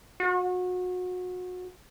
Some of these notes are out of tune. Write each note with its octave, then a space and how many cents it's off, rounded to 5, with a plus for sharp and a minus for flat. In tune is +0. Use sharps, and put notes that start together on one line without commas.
F#4 -30